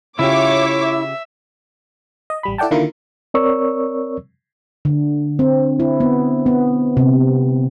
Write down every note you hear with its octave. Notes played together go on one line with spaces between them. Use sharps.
C#3 E4 F4 G4 C#5 E5 D6
D#5
A1 G3 B5
E4 A4 D5 F#5 G5 A5
D3 D#3 A#3 E4 F4 A#4
C4 A#4 C#5 D5 C#6 E6
D3
C4
E4
B3
B3
C3